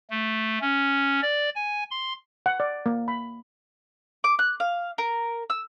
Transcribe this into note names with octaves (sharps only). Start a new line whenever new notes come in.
A3
C#4
D5
G#5
C6
F#5
D5
A#3
B5
D6
F#6
F5
A#4
E6